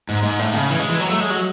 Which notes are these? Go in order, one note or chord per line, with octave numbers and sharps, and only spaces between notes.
G#2
G#2
A2
C#3
E3
G#3
E3
F#3
A3
G#3
F#3